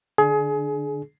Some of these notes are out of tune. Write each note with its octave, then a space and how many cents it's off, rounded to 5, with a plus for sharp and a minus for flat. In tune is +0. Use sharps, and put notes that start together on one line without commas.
D3 +0 D4 +10 G#4 +25